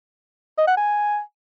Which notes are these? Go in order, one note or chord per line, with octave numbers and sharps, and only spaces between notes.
D#5
F#5
G#5